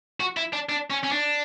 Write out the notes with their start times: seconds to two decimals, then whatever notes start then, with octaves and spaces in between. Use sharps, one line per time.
0.20 F#4
0.37 E4
0.53 D4
0.69 D4
0.91 C#4
1.04 C#4
1.12 D4